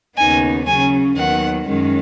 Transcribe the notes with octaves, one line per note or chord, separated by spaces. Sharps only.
D#2 C#3 B3 D#4 G#5
C#3 F#3 C#4 G#5
D#2 D#3 F#3 B3 F#5
F#2 D#3 G#3 C#4